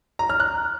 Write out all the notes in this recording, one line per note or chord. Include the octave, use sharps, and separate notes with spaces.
A#5
F6
F#6